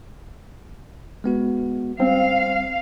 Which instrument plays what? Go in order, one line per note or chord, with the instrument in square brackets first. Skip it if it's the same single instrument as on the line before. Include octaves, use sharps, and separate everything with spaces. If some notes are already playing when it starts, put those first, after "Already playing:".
[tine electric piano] G#3 B3 F#4
[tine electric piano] G3 [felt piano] C4 [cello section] F5